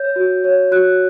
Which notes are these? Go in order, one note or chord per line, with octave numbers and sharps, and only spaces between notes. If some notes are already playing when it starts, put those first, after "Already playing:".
Already playing: C#5 G6
F#4
C#5
F#4 F#6